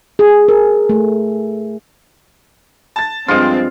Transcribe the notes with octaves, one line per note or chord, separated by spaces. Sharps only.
G#4
A#4
A3
A5 A6
G2 F3 G#3 C4 F4